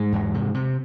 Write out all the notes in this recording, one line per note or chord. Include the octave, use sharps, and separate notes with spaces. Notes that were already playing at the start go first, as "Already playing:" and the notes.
Already playing: G#2 G#3
E2
C3
C3